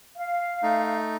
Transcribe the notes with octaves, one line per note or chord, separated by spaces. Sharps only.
F5
A3 D#4